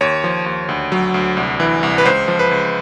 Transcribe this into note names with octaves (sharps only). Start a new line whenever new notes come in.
D#2 C#5
F3
D#2
D2
F#3
D2
C2
E3
C2
B4
C#2 C5
F3
B4
C#2